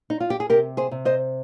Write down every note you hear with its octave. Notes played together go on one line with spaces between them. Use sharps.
D#4
F4
G4
G#4
C3 G4 A#4
G#4 C5
C3
C5 D#5